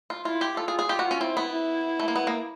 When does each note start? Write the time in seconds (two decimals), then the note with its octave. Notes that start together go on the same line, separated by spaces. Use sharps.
0.10 F4
0.25 E4 F4
0.41 G4
0.57 F4 A4
0.68 G#4
0.79 G#4
0.89 F4 G4
0.99 F#4
1.11 C#4
1.21 C4 E4
1.37 B3
1.53 E4
2.00 A3
2.08 A#3
2.16 B3
2.27 A#3